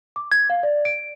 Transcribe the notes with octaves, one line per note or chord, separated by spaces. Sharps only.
D6
G#6
F5
D5
D7